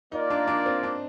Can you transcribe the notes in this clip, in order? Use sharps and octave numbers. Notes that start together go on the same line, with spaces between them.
A#3 D#4 F4 A#4 D5
D4
D4
C4
D4